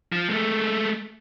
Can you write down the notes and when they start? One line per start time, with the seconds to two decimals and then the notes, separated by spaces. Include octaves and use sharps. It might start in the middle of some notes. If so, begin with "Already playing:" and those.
0.12 F3
0.30 G#3 A3